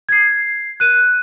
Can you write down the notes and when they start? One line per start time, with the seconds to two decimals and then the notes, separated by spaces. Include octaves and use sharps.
0.09 G#6 C7
0.80 F#6 D#7